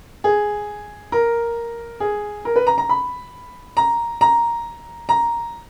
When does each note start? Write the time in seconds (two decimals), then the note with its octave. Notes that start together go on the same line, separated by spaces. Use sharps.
0.24 G#4
1.12 A#4
2.00 G#4
2.45 A#4
2.56 B4
2.67 A#5
2.78 A#5
2.89 B5
3.77 A#5
4.21 A#5
5.09 A#5